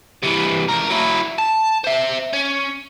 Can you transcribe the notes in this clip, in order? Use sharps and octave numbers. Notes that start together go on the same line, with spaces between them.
C3 E3
C#2 A#4
F#3 E4
A5
C5 E5
C#4